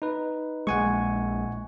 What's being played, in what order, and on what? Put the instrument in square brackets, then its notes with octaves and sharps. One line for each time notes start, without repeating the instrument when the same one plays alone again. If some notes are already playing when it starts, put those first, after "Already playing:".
[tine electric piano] D#4 B4
[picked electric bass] A#1 G#3 [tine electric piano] F#5 G#5 C#6